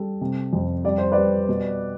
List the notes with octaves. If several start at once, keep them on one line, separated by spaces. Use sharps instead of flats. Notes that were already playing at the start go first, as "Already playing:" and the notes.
Already playing: G3 A4
C3
F2
G3 D5
C5
G3 B4 D5
B2